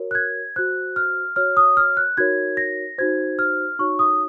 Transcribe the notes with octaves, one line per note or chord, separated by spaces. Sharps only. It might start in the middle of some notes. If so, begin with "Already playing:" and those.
Already playing: F#4 A#4 C#5
F#6
G#6
F#4 C5 F#6
F6
F#4 C#5 F6
D#6
F6
F#6
D#4 F#4 A#4 C#5 G#6
A#6
D#4 F#4 C5 G#6
F6
D#4 F#4 C#5 C#6
D#6